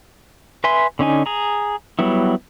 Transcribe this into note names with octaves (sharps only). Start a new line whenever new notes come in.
B4 E5 G#5 C6
D3 C#4 D#4 G#5
G#4 A#5
F#3 G3 B3 E4